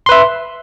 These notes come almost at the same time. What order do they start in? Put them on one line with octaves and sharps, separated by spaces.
C6 B4 E5